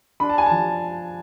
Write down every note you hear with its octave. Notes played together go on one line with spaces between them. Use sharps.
D4 B5
A5
G#5
A5
F3